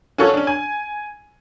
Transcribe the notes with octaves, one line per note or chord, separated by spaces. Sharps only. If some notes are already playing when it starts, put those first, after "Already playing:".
C#4 F4 F#4 A4 C#5
C#4 D4
G#5